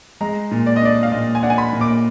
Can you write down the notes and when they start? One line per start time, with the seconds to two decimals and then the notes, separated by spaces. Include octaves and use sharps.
0.21 G#3 A#5
0.51 A#2
0.66 D5
0.76 D#5
0.82 D4 D5
1.03 F5
1.12 A#2 D#5
1.35 G#5
1.43 D4 F#5
1.50 G#5
1.58 B5
1.73 A#2
1.81 D6